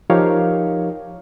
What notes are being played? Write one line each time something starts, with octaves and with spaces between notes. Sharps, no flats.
F3 D#4 G4 A#4 C#5 F5